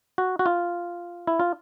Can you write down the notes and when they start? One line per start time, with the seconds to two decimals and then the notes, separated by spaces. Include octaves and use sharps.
0.18 F#4
0.39 F#4
0.46 F4
1.27 E4
1.40 F4